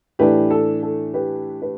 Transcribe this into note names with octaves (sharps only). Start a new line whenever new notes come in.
A2 E3 A3 D4 G4 B4
A4
A4
G4 B4
G4 B4